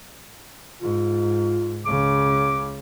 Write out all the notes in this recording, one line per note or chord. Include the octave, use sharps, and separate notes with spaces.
G#2 F4
C#2 C#3 D6